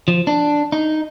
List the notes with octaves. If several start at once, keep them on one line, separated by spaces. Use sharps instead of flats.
F3
D4
D#4